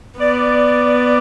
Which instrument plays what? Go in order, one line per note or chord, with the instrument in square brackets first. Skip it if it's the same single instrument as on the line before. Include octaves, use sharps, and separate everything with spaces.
[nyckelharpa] B3 [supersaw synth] D5